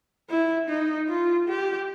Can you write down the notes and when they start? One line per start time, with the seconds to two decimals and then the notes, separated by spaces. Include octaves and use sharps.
0.30 E4
0.69 D#4
1.09 F4
1.48 G4